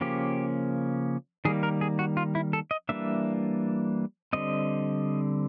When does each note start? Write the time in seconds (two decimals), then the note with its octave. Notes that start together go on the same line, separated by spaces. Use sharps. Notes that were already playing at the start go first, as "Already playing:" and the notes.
0.01 C#3 F3 A#3 C#4 G4
1.45 D#3 G3 A#3 G#4
1.63 A#4
1.81 G#4
1.99 F#4
2.17 F4
2.35 E4
2.53 A4
2.71 D#5
2.89 E3 G3 A#3 D4 E5
4.33 D3 G3 C4 D#5